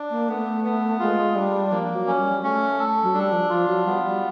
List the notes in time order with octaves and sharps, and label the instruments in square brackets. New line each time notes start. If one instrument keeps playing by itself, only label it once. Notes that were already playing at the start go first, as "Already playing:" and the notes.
Already playing: [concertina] D4
[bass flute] A#3
[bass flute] A3 [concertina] B3
[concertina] B3
[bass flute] G#3 [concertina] F4
[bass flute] G3 [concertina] D4
[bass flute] F3 [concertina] A#3
[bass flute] F#3
[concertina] C#4
[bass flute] G3
[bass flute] A3 [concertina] C#4
[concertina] A4
[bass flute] F#3
[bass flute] G3 [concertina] D4
[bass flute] F3
[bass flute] F3 [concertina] F4
[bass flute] F#3
[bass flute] G3 [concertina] B3
[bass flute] G3